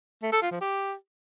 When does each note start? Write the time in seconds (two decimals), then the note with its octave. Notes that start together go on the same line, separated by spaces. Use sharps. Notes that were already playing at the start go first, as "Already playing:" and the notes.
0.23 A3
0.32 A4
0.42 F4
0.51 F3
0.61 G4